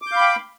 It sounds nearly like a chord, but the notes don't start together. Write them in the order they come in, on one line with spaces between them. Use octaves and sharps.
D6 G6 F5 B5 G5